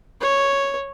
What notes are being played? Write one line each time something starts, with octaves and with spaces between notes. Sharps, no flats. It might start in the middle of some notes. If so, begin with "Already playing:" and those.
C#5